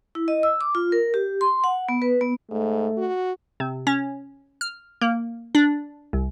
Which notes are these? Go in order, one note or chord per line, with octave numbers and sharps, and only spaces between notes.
E4
D#5
E6
D6
F4
A#4
G4
C6
F#5
B3
B4
B3
G#2 A3
F#4
C3
C#4
F6
A#3
D4
C2